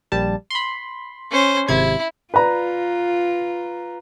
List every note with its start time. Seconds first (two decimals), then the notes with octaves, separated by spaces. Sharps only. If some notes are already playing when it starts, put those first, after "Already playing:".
0.12 A#1 G3 A5
0.50 B5 C6
1.31 C#4 C5
1.68 G#1 C3 E4 G#6
2.34 F4 B4 D5 A#5